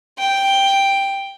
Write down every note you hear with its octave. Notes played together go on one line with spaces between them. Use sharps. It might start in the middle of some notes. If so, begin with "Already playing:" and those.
G5